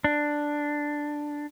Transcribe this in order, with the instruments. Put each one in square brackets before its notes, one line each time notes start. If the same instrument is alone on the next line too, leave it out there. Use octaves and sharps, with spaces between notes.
[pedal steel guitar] D4